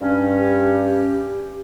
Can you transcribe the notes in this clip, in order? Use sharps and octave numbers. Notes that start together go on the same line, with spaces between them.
G2 C#4
G4